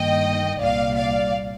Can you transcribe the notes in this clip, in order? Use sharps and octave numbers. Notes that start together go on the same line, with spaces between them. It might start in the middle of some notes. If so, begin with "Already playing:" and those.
Already playing: G2 D#3 A#3 D#5 G5
C2 A#2 G3 D5 F5
D5 F5